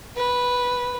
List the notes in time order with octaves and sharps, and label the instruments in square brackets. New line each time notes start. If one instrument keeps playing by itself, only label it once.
[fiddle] B4